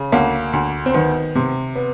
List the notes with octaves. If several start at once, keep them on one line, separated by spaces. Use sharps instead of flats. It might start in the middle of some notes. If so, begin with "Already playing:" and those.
Already playing: C#3
D2 A#3
D2
C4
D#3 B3
C3
B3